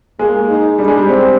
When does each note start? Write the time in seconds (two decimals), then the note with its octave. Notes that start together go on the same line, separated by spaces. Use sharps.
0.19 G#3 A#3
0.49 D#4
0.78 G3 D4
0.88 G#3
0.97 G3
1.08 C4